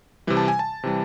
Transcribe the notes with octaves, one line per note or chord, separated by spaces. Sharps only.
C3 E3 G3
A5
G#5
A5
C3 E3 G3